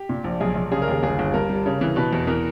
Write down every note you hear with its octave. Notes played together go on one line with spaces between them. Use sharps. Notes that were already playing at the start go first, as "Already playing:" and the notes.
Already playing: G4
A#2
A#1
B1 G#4
B1
C#3 G#4
A#4
D#2 G#4
G1 G#4
G1
G2 A#4
G3
C#3
E3
B2 B4
E2
E3 A#4